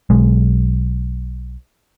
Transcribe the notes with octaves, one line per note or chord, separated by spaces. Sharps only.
B1 G#3